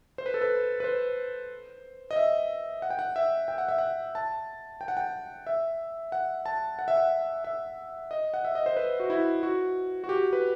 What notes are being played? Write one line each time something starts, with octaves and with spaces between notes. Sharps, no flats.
C5
B4
A4
B4
B4
C5
D#5
E5
F#5
G5
F#5
E5
G5
F#5
E5
F#5
A5
G5
F#5
G5
E5
F#5
A5
F#5
E5
F#5
E5
D#5
F#5
E5
D#5
C5
B4
F#4
E4
F#4
F#4
G4
B4